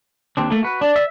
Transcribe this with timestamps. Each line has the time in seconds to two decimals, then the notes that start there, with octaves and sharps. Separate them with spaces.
0.37 D#2 C4 D4
0.50 A3 A#3
0.63 F#4 B4
0.81 D4 D5
0.96 E5